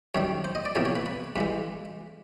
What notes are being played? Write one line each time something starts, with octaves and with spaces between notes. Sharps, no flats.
F#2 D#3 G3 C#5
C5
D#5
D5
E2 C3 F3 A#3 C#5
C#5
B4
B4
G2 E3 G#3 B4